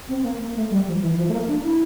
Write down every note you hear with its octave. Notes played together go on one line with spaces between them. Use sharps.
C4
C4
A#3
A#3
A3
G3
F3
E3
F3
A3
A#3
D4
E4